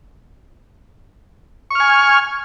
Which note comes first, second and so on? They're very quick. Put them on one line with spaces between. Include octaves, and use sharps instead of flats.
C#6 F6 G#5